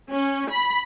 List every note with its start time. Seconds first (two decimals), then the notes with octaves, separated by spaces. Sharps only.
0.11 C#4
0.52 B5